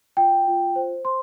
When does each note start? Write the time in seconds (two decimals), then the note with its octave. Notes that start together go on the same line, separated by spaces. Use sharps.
0.17 F4 G5
0.47 F4
0.76 C5
1.05 C5 C6